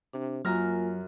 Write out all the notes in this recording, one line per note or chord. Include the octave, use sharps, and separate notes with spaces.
C3 D4
F#2 F#3 A#3 F4 G#5 A#5 F6